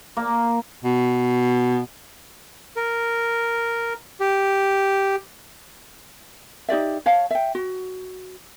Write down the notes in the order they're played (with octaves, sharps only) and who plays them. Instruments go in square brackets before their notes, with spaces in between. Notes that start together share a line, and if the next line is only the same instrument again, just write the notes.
[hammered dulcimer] A#3
[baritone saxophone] B2
[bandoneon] A#4
G4
[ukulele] D#4 G4 D5 E5
C#5 F5 A5
E5 G5
F#4